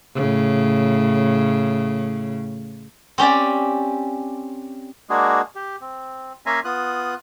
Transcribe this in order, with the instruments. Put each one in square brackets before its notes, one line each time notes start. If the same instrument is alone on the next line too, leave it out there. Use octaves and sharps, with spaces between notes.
[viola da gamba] A2 C#3
[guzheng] C4 C#4 G4 D5
[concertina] G#3 A#3 D4 F#4 G#4
G4
C4
A#3 C#4 E5 G#5 A#5 C6
B3 F4 D#6 F#6